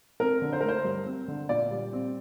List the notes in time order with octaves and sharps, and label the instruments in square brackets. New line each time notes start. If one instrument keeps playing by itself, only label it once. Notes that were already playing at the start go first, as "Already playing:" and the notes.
[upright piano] C4 A#4
D3
C5
A3 A#4
C5
G2
C4
D3
A#2 D5
G3
C4